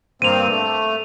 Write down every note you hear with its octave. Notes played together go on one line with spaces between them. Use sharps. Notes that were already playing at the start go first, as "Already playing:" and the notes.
G2 A#3 C4 D#7 F7
A3